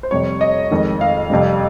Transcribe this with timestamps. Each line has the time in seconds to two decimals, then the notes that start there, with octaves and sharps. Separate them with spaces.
0.03 C5
0.11 F2 C3 G3 C#5
0.41 D#5
0.71 F2 D#3 G#3
1.01 F5
1.30 F2 C3 G3